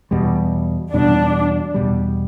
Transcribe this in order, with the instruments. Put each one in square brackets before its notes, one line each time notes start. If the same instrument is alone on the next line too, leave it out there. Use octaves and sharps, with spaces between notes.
[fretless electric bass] E2 B2 G3
[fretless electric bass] E2 B2 G3 [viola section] D4
[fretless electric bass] E2 B2 G3